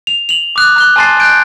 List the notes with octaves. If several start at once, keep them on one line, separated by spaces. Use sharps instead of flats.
F7
F7 F#7
D6 D#6 F#6
A#5 F#6 G7
G#5 A5 C6 A6 C7
F#6 G6 D7